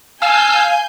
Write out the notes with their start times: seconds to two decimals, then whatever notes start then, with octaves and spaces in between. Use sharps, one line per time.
0.22 F5 G#5 A5 E6 F6 G6